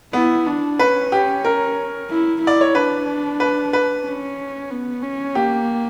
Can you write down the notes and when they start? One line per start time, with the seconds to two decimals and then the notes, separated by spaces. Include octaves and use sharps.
0.13 B3 E4
0.46 D4
0.79 C#4 B4
1.12 G4
1.45 A#4
2.10 E4
2.42 E4
2.47 D5
2.61 C#5
2.75 D4 B4
3.40 B4
3.73 B4
4.06 C#4
4.71 B3
5.03 C#4
5.35 A#3 G4